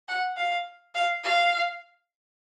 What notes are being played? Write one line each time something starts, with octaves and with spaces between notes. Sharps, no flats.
F#5
F5
F5
F5